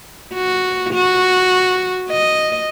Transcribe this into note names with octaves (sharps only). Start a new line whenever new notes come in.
F#4
F#4
D#5